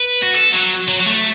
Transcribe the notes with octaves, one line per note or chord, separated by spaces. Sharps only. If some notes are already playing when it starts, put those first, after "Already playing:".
Already playing: B4
F#4
A4
F#3
F#3
F#3
A3